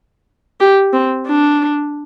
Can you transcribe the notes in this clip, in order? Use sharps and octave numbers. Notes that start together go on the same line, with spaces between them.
G4
C4
D4